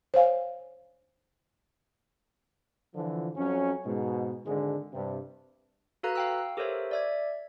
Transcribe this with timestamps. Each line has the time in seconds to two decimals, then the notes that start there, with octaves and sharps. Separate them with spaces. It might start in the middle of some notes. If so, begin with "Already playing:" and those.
0.14 C5 C#5 F5 G#5
2.93 D3 E3 F3
3.36 F2 F#3 C#4
3.85 G#2 B2
4.44 G#1 D3 G#3
4.93 G2 C3
6.03 F#4 A4 B4 F5 A#5 F#6
6.15 F5 G5 E6
6.57 G4 A4 A#4 C5 C#5 E5
6.91 D5 E5 G#6